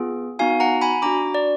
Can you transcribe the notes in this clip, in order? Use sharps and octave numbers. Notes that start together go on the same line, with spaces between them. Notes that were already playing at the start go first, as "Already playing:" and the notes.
Already playing: B3 F4 G#4
B3 D#4 F#4 F5 G#5
F#5 A#5
G#5 B5
D4 F#4 A#5 D6
D5